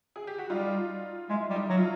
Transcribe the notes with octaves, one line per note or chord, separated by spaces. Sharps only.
G#4
G4
F#4
G3 D#4 F4
G#3 E4
G3
D#4
F#3
F4